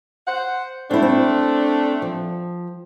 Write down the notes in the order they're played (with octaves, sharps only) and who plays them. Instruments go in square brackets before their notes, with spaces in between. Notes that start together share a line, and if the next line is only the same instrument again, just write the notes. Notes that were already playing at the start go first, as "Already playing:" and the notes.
[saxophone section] C5 F#5
[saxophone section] A3 D4 [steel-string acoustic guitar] C4 E4
[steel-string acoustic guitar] C4
F3